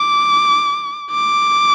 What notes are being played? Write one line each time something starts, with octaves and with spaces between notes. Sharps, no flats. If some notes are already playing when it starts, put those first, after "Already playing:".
Already playing: D6
D6